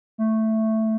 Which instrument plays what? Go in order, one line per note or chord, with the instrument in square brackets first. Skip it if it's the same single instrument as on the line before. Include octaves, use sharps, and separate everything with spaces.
[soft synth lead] A3